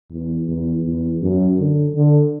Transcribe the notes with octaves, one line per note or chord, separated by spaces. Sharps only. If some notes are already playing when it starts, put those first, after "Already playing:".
E2
E2
E2
F#2
D3
D3